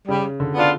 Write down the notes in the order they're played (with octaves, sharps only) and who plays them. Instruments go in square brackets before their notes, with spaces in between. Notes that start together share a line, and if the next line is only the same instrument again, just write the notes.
[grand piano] C#3 [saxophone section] G3
[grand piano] D3
[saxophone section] B3 D4 F4